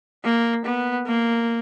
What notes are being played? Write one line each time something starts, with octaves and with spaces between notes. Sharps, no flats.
A#3
B3
A#3